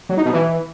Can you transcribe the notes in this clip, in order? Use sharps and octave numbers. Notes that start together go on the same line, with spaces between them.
F#3
D#4
B2
E3